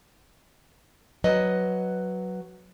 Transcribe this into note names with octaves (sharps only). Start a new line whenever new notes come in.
F#3 B4 D#5